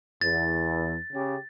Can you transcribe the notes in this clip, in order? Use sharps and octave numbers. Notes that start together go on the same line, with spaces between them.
E2 A6
C#3 G4